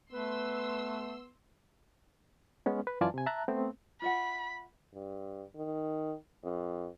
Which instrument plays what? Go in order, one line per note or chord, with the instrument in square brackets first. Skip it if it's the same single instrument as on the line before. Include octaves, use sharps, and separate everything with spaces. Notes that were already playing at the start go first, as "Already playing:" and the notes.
[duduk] A3 [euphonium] B3 [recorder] B4 [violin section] C6 E6
[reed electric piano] G#3 B3 C#4
B4
F#2 E3 F4 D5 G#5 A5
C3 G#5
E5 A5 A#5 F#6
A3 B3 C4
[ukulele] F4 E5 F#5 [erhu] B5
[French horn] G2
D#3
F2